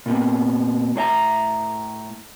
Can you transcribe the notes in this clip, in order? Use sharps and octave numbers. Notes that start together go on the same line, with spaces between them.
A#2 B3 C4
A2 D4 E5 A#5